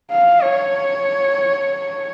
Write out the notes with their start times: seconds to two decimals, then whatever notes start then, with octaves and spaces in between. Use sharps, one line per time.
0.11 F5
0.43 C#5